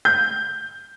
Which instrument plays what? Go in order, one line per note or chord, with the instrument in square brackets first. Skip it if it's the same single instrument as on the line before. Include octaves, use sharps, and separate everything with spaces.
[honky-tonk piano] G6